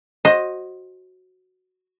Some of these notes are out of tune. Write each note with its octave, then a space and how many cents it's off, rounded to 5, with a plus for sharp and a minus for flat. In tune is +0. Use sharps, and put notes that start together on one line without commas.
F#4 +0 C5 +20 D#5 +0